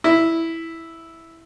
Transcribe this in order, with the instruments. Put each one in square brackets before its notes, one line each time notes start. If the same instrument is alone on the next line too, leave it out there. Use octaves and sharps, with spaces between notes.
[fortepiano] E4